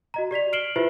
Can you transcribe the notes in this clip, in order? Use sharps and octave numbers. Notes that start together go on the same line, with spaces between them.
F#4 D#5 A#5
G4 D5 B6 F7
F6 C7 D7 E7 F#7 G7
E4 F4 G4 B4 C5 E5